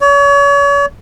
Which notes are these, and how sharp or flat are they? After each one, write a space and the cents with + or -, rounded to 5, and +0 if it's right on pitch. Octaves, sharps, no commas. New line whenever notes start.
C#5 +35